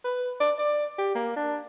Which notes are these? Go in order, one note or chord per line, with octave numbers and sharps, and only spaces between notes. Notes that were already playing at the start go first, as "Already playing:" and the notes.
B4
D5
D5
G4
A#3
D4